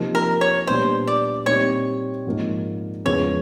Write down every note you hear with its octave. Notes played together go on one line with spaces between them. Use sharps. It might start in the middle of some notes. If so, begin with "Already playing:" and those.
Already playing: C3 F3 A#3 D#4
A#4
C#5
A#2 G3 B3 D4 C5
D5
A#2 G3 C4 D#4 C#5
G#2 F3 A#3 D#4
E2 C#3 F3 G#3 C#4 C#5